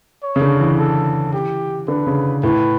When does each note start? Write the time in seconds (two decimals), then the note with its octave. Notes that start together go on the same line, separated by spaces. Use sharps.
0.23 C#5
0.36 C#3
0.41 D3
0.60 E3
0.78 A4
1.33 G4
1.88 D3 B4
2.07 C#3
2.43 A2 B4